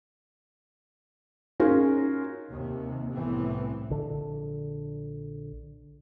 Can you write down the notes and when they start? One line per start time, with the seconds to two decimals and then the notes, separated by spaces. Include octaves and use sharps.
1.60 C#4 D#4 F4 F#4 G#4 A#4
2.50 D#2 C3
3.13 C2 A2 E3 B3 C4
3.90 A#1 D3